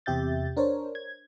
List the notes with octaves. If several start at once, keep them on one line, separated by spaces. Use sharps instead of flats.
E2 C3 G4 E5 G6 A6
D4 A#4 C5 C#5
G#6